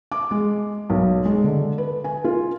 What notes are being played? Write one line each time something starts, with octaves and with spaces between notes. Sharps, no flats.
D6
G#3
B1
G#3
D3
B4
G#5
F4